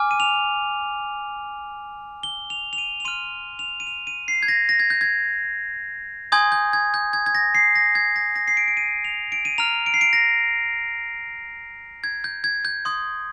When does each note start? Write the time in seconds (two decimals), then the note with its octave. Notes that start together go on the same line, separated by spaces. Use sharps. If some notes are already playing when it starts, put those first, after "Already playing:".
Already playing: G#5 D6 F6
0.11 D#7
0.20 F7
2.23 G7
2.50 F7
2.73 F7
2.78 D#7
3.00 F7
3.05 C6 F6 D#7
3.59 F7
3.80 D#7
3.87 F7
4.07 D#7
4.28 C7
4.43 G#6
4.48 A#6
4.69 A#6
4.80 G#6
4.90 G6
5.01 G#6
6.32 G#5 C6 D#6 G6 G#6
6.52 G6
6.73 G#6
6.94 G6
7.13 G#6
7.26 G#6
7.35 A#6
7.55 C7
7.75 A#6
7.95 G#6
8.16 A#6
8.36 A#6
8.48 C7
8.57 D7
8.68 D7
8.77 D#7
9.05 F7
9.32 D7
9.45 D#7
9.58 A#5 F6 F7
9.86 D7
9.94 C7
10.01 D7
10.13 A#6
12.04 G#6
12.24 G6
12.44 G#6
12.65 G6
12.85 C6 D#6 G6